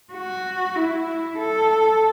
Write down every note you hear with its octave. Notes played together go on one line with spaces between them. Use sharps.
F#4
E4
A4